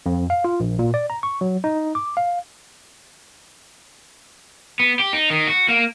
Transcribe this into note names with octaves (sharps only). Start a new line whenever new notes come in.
F2
F5
F4
A#1
A#2
D5
A#5
C#6
F#3
D#4
D6
F5
B3
G4
D#4
D#3
F#4
A#3